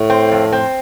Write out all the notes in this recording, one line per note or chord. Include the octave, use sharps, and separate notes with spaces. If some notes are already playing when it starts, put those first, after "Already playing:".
Already playing: A2
C4
F2
C4